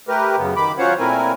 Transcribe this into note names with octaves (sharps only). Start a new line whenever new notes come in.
A3 G4 A#4 B4
F#2 C#3 B3
D#3 B5 D6
F#3 C#4 F4 C5 C#5 F#5
A#2 A3 C4 E4 A#4 G#5